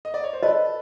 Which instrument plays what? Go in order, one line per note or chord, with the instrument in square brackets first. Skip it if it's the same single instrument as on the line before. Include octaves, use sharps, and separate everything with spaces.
[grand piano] D#5
D5
C#5
C5
[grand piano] A4 B4 [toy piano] D#5